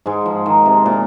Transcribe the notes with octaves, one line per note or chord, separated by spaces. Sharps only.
G#2 G#3
F3
D#3
C3
A#2